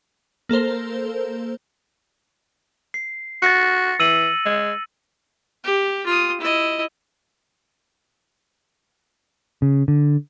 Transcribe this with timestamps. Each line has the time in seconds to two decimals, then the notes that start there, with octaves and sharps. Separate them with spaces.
0.49 A#3 A4 A#4 C5
2.94 C7
3.42 F#4 A6 A#6 C#7
4.00 E3 E6 D#7 F#7
4.46 G#3
5.64 G4
6.06 F4 D#6
6.40 E4 D#5
9.62 C#3
9.88 D3